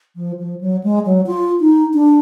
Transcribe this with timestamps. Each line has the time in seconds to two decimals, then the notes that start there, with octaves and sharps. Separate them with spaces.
0.16 F3
0.39 F3
0.61 F#3
0.83 G#3
1.05 F#3
1.27 F4
1.60 D#4
1.94 D4